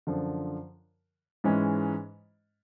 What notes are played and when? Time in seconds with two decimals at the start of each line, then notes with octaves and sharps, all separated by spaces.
0.07 F#2 D3 F3
1.44 G#2 E3 G#3 C#4